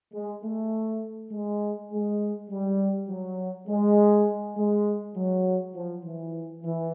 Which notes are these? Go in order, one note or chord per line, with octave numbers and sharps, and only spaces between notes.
G#3
A3
G#3
G#3
G3
F#3
G#3
G#3
F#3
F3
E3
E3